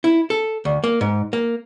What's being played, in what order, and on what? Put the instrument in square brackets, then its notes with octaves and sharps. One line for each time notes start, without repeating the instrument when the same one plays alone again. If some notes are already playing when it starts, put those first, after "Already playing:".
[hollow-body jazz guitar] E4
A4
D2
A#3
G#2
A#3